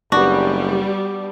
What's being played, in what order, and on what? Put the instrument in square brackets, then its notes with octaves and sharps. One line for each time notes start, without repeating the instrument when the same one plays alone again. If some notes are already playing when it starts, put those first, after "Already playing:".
[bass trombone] F#1 [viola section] G3 [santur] B3 D4 [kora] F#4